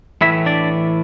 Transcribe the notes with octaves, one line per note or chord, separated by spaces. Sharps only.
A2 E3 E4 E5
D4 D5